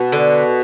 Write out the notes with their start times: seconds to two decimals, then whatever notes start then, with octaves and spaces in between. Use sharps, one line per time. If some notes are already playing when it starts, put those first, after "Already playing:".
Already playing: B2
0.12 D3